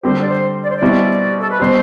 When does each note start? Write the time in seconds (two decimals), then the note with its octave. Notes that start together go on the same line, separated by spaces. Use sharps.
0.03 D3 G3 C4 G4 C5
0.22 D5
0.29 C5
0.63 D5
0.71 C5
0.78 B2 G3 C4 E4 D5
1.29 G4
1.40 A4
1.50 B4
1.60 B2 G3 C5